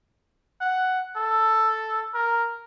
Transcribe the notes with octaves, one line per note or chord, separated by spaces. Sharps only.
F#5
A4
A#4